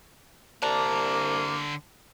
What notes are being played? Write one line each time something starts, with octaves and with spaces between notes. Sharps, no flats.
C2 D3 A#3 D4 A#5